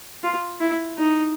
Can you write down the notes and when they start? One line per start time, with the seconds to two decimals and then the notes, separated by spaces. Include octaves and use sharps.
0.24 F4
0.60 E4
0.98 D#4